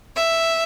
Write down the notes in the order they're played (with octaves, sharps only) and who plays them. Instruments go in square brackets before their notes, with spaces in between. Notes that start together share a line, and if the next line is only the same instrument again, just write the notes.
[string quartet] E5